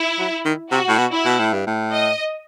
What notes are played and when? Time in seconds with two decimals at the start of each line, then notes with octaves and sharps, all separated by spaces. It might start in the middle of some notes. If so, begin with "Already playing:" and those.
Already playing: E4
0.18 F#3
0.45 D#3
0.71 C3 F#4
0.88 A2
0.98 B2
1.12 E4
1.25 B2
1.39 A2
1.54 G2
1.67 A2
1.92 D#5